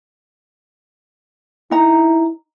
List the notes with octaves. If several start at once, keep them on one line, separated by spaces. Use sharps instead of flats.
D#4 E4 A#5